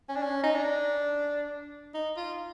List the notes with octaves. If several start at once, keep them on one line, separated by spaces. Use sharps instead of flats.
C#4
D4
C#4
D#4
D4
D#4
F4